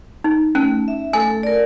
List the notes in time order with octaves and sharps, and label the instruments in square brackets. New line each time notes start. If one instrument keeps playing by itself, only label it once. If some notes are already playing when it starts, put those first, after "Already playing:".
[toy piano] D#4
[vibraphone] A3 [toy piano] C#4
[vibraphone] E5
[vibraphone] A3 A4 [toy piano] G#5
[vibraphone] A#4 D5